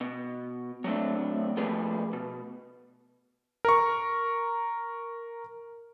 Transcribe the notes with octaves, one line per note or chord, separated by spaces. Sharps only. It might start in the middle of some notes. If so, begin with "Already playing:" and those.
B2
F#3 G3 A3 C4 D4
F3 G3 A3 A#3 G#4 B4
B2
A#4 C#6